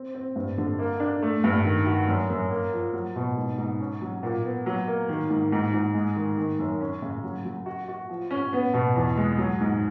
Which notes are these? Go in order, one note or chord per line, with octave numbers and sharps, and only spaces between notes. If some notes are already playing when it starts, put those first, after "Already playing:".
Already playing: C4
C4
G2
D3
A#3
D4
A3
G2
D#3
F#4
F#2
F#2
A#3
F3
F#3
B2
G#2
G#2
C#4
F#3
A#2
B3
F#3
A#3
D#3
G#2
G#2
G#2
G#3
D#3
D#3
F#2
C#4
C#3
F#3
F#3
F#4
F#4
F3
C#4
B3
B2
E2
G#3
F#3
G#2